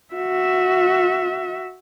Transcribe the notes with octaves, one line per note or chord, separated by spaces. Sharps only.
F#4 E5